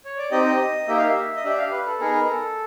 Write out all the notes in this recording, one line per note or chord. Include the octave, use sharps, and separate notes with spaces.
C#5
D5
C4 D#4 G4 D#5
A#3 D#4 G4 E5
F5
E5
D#5
D4 G4 E5
F5
B4
A4
B3 D#4 G#4 A#4
A4